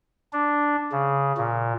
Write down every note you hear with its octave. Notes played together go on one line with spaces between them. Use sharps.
D4
C#3
A#2